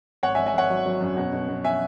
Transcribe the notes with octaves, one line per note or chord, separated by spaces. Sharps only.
G#1 C#5 F#5
E5 G#5
G#1
E5 G#5
G#1 C#5 F#5
F#3
F#3
F#2
B2
B2
B2
E5 G#5